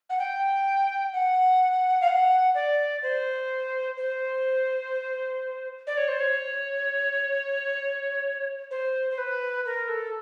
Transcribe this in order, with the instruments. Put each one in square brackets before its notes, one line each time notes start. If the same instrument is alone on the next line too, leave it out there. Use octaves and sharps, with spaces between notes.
[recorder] F#5
G5
F#5
F5
F#5
D5
C5
C5
D5
C#5
C5
C#5
C5
C5
B4
A#4
A4